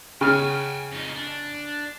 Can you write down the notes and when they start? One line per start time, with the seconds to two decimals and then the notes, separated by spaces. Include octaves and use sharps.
0.21 C#3 G5 G#5 F6
0.92 F2 D#4
1.15 D4